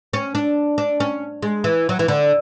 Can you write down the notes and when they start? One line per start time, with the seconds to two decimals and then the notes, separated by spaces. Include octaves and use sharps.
0.13 C#4
0.35 D4
0.78 D4
1.00 C#4
1.42 G#3
1.64 E3
1.89 F#3
1.99 E3
2.08 D3